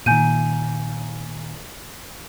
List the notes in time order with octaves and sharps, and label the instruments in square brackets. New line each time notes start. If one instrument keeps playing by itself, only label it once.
[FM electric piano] A#2 D#3 [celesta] G#5 G6 D#7